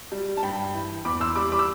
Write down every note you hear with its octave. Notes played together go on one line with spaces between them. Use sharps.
G3
A5
G2 G5 B5
E3
E2 B5 D6
C6 E6
G3 B5 D6
B5 D6
E6